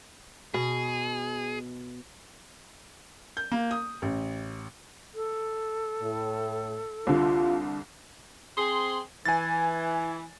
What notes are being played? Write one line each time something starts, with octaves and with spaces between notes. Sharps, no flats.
B2 G#4
G6
A#3
D#6
A1
A4
A2
C2 D3 F4
C4 G#4 C6
E3 G#5 A6